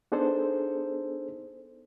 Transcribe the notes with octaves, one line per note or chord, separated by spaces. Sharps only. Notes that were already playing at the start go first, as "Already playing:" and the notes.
B3 D4 D#4 G#4 A4 C5